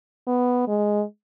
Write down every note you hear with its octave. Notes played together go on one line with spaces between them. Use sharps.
B3
G#3